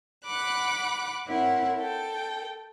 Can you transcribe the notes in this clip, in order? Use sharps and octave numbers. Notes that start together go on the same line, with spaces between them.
F#5 B5 D6 F#6
C4 E4 A#4 C#5 F#5
A4 G5